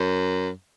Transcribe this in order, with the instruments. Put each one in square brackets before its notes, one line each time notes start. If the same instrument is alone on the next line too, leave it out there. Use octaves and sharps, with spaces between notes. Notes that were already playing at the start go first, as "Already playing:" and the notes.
Already playing: [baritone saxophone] F#2